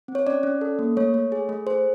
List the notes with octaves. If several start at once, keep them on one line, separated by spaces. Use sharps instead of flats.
C4
C#5
C#4 D5
C#4
A4
A#3
A3 C#5
A3
G#4
A3
G#4 C5